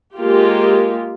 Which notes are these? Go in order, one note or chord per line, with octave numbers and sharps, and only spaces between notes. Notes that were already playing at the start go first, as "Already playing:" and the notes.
G#3 A#3 F4 G4